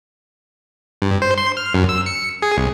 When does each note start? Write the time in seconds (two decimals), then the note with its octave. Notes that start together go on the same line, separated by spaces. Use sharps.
1.02 G2
1.22 C5
1.38 C6
1.57 F6
1.74 F#2
1.89 E6
2.06 C#7
2.42 G#4
2.57 C2